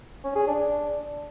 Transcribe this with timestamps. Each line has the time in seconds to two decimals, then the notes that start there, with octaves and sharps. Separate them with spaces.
0.24 C#4
0.36 G#4
0.47 D4